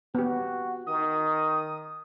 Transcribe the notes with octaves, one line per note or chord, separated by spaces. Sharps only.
B3 F#4 G4
D#3 D#6